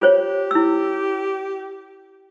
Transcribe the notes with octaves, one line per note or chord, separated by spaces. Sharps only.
F4 G4 C5 C#5
E4 E6